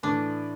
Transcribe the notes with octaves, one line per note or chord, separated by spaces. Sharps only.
A2 E3 A3 D4